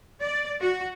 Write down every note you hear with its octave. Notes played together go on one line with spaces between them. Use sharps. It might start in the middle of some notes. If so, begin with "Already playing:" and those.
D5
F#4